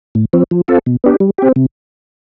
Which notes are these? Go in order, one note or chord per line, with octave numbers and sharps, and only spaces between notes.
A2
F3 C4
F3
C4 F4 A4
B2
B3 D4 G4
G3
C4 G4
C3